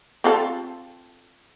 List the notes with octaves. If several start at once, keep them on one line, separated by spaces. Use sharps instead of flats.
C4 F4 A4